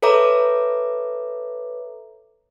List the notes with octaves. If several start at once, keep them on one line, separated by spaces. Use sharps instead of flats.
A4 B4 C#5 E5 A#5 D6